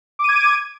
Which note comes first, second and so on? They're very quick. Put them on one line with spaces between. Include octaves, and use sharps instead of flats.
D6 D#7 G#6